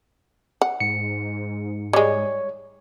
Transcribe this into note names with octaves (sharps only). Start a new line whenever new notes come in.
F#5
G#2 C#7
G3 G#3 C#5